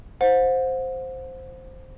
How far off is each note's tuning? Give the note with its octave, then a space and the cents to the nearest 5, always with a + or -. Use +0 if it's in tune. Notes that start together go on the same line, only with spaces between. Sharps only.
C5 +0 F#5 -40